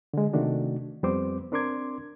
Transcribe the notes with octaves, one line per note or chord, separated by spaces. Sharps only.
D3 G#3
C3 D#3 A3 D4 F#4
F2 G3 B3 C4 C5 D6
C4 D4 A#4 C6 D6 G#6